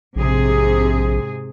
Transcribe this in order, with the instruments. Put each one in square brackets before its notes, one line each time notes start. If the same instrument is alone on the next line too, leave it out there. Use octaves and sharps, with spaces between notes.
[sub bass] A#1 [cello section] G#2 C3 G#4